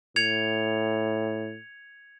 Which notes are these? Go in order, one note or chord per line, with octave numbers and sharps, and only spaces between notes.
A2 G#6 C#7 F7